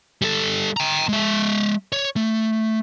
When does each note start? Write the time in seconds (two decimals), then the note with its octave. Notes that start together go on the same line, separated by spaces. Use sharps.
0.22 G3 A4
0.77 G5 A#5
1.08 G#3 E5
1.92 C#5
2.16 A3